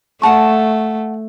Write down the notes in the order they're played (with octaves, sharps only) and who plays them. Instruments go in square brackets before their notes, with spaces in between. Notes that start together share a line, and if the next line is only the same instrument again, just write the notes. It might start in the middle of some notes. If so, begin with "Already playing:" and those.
[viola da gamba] A3 [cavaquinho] F#5 A5 C#6